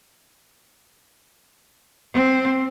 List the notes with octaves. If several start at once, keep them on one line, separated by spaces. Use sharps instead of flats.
C4